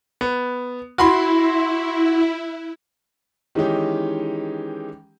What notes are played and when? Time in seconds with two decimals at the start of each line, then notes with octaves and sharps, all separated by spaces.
0.21 B3
0.98 E4 F#4 B5 C6
3.55 D#3 E3 G#3 C#4 D#4 G4